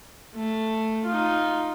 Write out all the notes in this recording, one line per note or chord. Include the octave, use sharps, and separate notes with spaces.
A3
D#4 F4